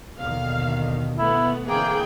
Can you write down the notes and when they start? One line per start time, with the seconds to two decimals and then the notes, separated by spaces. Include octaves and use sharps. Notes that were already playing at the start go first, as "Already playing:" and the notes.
0.19 D#2 B2 D3 D#3 F5
1.18 A3 B3 E4
1.67 D3 E3 A#3 C4 G#4 G5